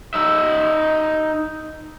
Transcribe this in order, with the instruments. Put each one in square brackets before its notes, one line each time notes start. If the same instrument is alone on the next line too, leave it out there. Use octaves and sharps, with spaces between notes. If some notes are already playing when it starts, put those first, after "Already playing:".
[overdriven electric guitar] D#4 E5